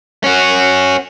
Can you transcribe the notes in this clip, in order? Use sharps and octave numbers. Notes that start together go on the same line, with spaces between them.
C#4 F#4